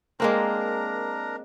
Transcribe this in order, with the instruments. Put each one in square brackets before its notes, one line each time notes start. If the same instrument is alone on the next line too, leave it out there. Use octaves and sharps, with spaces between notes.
[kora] G#3 A#3 C4 [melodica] D4 A#4 A#5